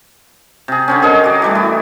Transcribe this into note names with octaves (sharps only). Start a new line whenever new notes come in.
C3 G#4
D3 C4 C#4
G#4 A#4 C#5 D#5
F#4 D5
E3 G3 A3
E4